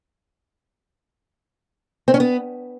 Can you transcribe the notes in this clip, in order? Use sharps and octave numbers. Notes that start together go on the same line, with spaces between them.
C4
C#4
B3